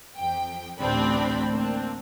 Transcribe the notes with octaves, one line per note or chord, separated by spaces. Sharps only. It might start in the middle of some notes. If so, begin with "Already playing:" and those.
F2 G5
A1 D2 C4 D4 B5
A#3 C4 D4